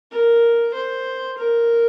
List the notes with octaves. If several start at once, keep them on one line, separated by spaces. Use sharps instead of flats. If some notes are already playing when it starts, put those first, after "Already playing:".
A#4
C5
A#4